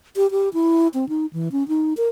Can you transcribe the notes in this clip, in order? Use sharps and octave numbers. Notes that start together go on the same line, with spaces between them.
G4
G4
E4
C4
D#4
E3
C#4
D#4
A#4